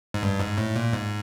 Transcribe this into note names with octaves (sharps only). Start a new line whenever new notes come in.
G#2
G2
G#2
A2
A#2
G#2